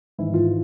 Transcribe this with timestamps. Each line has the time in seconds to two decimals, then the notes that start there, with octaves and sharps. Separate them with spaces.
0.18 G#1 G#2 E3 E4
0.34 F4